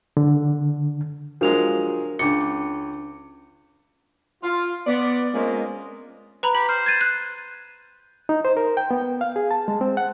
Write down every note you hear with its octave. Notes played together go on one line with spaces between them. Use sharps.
D3
F3 F#3 G#3 D4 A#4 F7
C#2 D4 D6 C#7
F4
B3 D5
G#3 A#3 C4 C#4 F4 D#5
B4 A#5 B5
G4 B5
C5 F6
G#6 A6 D#7
F#6
D#4
C5
A#4
G5
B3
F5
G#4
A5
G#3
C4
F#5